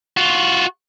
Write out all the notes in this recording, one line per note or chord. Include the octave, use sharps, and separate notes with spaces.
F4 F#4